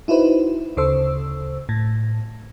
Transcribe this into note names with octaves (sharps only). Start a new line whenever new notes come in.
D#4 E4 F#4 B4 C5
D2 C#3 A4 C5 E6
A2